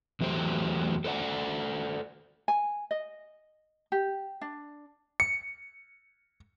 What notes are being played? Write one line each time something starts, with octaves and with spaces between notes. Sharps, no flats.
E2 F#3 A3 G4 C5
A4 C5 D5 F#5
G#5
D#5
G4
D4
C#7